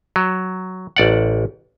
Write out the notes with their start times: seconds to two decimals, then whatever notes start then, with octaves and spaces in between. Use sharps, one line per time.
0.16 F#3
0.96 A1 D5 F#5